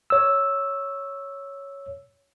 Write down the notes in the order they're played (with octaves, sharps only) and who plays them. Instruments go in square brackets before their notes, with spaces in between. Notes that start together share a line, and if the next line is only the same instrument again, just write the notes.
[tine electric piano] C#5 E6